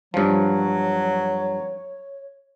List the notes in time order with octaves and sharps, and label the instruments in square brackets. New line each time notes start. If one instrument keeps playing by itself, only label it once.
[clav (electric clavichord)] G2 F3 [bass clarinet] F#3 [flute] C#5